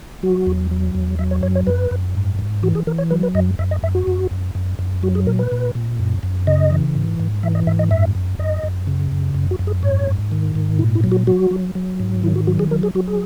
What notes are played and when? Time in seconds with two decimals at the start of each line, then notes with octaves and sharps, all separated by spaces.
0.23 F#3 F#4
0.47 E2
0.71 F#3
0.95 E2
1.19 F#3 E5
1.31 C#5
1.43 F#2 C#5
1.55 C#5
1.67 F#2 B4
1.91 F#2
2.15 G#2
2.39 G#2
2.63 E3 F#4
2.75 G#4
2.87 E3 A#4
2.98 C#5
3.11 F#3 B4
3.23 B4
3.35 F#2 D#5
3.59 F#2 E5
3.71 D#5
3.83 F#2 E5
3.95 F#4
4.07 F#2
4.31 F#2
4.55 F#2
4.79 F#2
5.03 F#3 F#4
5.15 G#4
5.27 A#2 A#4
5.39 B4
5.52 A#2
5.75 A#2
5.99 F#2
6.23 F#2
6.47 C#3 D#5
6.71 E3
6.95 G#2
7.20 G#2
7.43 E3 E5
7.55 D#5
7.67 G#2 E5
7.79 D#5
7.91 F#2 E5
8.15 F#2
8.39 F#2 D#5
8.63 F#2
8.87 C#3
9.12 F#2
9.35 F#2
9.51 F#4
9.59 F#2
9.67 G#4
9.83 G#2 C#5
10.07 G#2
10.31 D#3
10.55 G#2
10.79 A#2 E4
10.95 E4
11.04 F#3
11.12 F#4
11.27 F#3 F#4
11.51 F#3
11.75 F#3
12.00 G#2
12.23 D#3 E4
12.36 F#4
12.47 F#3 F#4
12.59 G#4
12.71 F#3 A#4
12.83 G#4
12.95 F#3 F#4
13.07 G#4